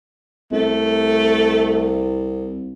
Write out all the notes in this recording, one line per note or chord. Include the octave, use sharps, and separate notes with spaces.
C2 A3